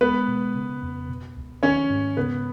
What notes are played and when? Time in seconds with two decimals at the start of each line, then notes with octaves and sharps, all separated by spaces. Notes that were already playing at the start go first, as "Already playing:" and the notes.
0.01 G#3 B3 B4
0.28 B2
0.55 C#3
0.82 F2
1.09 B2
1.36 C#2
1.63 D#3 C#4 C#5
1.90 G#2
2.17 C#3 B3 B4